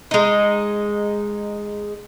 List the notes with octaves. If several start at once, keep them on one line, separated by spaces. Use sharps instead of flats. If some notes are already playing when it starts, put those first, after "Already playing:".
G#3 D#4